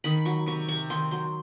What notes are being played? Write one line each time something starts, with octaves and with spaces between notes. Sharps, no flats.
D#3 B5
F#3 C#6
C3 C#6
C3 C#6
D#3 C6
F#3 C6